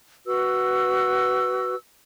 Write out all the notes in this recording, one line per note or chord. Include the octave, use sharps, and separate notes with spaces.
F#4 B4 E6